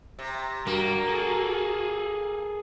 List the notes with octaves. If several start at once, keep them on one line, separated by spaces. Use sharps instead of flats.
C3
G3 A#3 D4 F#4
G#4 A4